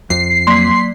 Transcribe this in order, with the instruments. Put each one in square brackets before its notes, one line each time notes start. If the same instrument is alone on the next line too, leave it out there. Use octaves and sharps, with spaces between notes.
[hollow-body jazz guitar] F2 [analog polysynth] C7
[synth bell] F#3 A#3 D5 [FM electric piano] C6 B6